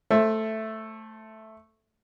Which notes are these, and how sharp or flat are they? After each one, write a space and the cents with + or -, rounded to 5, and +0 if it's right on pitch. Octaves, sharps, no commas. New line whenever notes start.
A3 +0 C5 +25 E5 +5